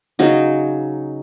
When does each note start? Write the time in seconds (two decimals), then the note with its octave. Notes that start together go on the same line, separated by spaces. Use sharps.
0.19 C#3 F#3 D#4